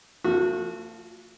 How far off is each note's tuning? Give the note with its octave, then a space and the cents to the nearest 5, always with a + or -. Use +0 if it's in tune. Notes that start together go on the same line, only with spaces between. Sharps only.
F3 +0 A3 +45 F#4 -25